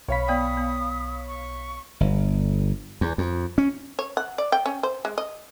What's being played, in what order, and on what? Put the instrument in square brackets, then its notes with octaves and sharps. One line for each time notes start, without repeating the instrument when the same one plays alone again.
[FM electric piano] B1 B6 [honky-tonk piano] C#5 F5 B5
[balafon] B3 D5 G5 [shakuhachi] D#6
[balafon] B3
[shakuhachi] C#6
[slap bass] G1
E2
F2
C#4
[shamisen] C#5
F#5
D5
G5
C#4
C5
G#3
D#5